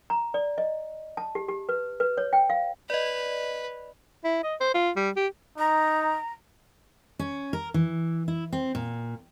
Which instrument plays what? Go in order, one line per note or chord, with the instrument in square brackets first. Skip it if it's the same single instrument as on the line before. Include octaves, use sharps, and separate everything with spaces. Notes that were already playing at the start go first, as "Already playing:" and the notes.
[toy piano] A#5
D5
D#5
A5
G4
G4
B4
B4
C#5
G5
F5
[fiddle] B4 [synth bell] D5 D#5
[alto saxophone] E4
D#5
C5
F4
G3
G4
[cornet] D#4 [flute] A#5
[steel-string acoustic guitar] C#4
A#4
E3
E4
C4
A#2